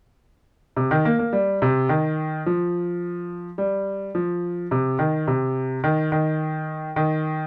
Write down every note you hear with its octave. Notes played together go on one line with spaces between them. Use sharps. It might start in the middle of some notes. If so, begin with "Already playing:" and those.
C3
D#3
A#3
A#3
G3
C3
D#3
F3
G3
F3
C3
D#3
C3
D#3
D#3
D#3